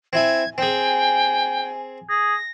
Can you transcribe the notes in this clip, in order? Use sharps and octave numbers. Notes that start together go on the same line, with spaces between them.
C4 E4 G#5 G#6
C4 G#4 G5 G#5
G#4 A#6